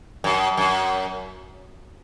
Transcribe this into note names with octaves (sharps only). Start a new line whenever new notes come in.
F#2
F#2